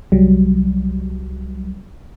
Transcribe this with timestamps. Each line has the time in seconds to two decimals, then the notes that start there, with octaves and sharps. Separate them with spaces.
0.12 C2 F#3 G3